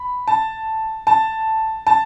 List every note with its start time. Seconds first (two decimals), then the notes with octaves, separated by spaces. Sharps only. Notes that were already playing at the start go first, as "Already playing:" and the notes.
Already playing: B5
0.28 A5
1.07 A5
1.87 A5